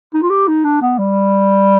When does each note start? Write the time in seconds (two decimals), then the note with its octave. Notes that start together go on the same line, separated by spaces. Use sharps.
0.14 D#4
0.22 F4
0.30 G4
0.48 D#4
0.64 D4
0.81 B3
0.98 G3